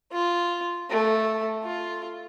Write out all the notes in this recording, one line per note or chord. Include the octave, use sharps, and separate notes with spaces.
F4
A3
F4